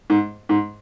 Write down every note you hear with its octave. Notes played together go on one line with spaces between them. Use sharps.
G#2
G#2